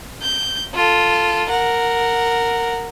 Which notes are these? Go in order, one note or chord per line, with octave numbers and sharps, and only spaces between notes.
G6
F4 A4
A#4 F#5